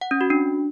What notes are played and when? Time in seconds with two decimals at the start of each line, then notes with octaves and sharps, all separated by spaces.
0.01 F#5
0.11 C#4
0.21 F#4
0.30 D4